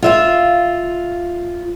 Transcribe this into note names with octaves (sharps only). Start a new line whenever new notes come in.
F4 E5 F5